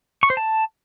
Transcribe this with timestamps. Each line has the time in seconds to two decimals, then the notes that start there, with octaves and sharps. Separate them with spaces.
0.23 C#6
0.30 C5
0.37 A5